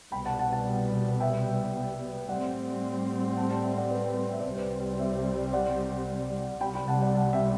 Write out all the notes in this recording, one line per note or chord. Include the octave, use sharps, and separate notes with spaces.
C2 B2 G3 B3 G5 B5
F#5 A5
F#5 A5
F#5 A5
E5 G5
A2 G3 C4 D5 F#5
F#5 A5
F#5 A5
E5 G5
D5 F#5
B4 D5
B4
E5
D5
C2 C3 G3 C4 C5
B4 D5
C5 E5
C5 E5
D5 F#5
C2 C3 G3 G5 B5
G5 B5
F#5 A5
D5 F#5
F#5 A5
E5 G5